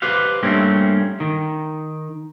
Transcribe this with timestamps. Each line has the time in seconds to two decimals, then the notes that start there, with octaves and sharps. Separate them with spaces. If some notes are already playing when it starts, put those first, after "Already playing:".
0.02 G4 B4 C5 F5
0.43 G2 A3 A#3 C4 C#4
1.20 D#3